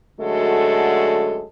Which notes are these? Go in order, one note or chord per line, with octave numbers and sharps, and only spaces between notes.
F#2 D3 G#3 A3 F#4 A4